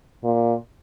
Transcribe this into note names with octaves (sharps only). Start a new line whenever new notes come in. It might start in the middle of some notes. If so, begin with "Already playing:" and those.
A#2